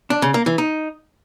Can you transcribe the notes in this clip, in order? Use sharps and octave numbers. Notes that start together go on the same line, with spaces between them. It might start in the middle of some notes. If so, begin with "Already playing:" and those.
D4
C#3
A#3
E3
D#4